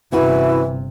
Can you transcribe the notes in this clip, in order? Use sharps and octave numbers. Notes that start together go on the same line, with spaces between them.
G1 C3 E3 C#4 E4 F#4 B4